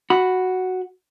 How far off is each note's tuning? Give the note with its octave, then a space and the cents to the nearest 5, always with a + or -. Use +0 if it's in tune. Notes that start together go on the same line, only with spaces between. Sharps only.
F#4 +0 B5 +0